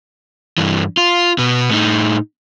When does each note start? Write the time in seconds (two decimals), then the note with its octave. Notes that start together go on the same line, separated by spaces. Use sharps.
0.58 G2 E3
0.97 F4
1.38 B2 B3
1.71 A2 D#4